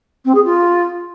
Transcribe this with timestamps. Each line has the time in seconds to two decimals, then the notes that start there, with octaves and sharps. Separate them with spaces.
0.25 C4
0.35 G#4
0.44 F4